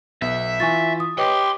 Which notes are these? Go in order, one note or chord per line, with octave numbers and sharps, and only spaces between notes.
B1 B3 E5
E3 F4 G#5 C#6 A6
D#6
G4 B4 C#5 D#5 B5 C6